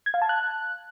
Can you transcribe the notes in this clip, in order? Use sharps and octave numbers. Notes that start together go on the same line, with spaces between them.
G#6
F5
A5
F#6